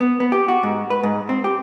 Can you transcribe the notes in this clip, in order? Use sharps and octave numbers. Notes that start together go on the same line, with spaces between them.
B3
B3
G4
F#4
G#2
B4
G#2
C4
G4